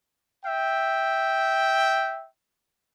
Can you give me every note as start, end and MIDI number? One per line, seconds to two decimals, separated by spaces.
0.45 2.26 76
0.45 2.26 79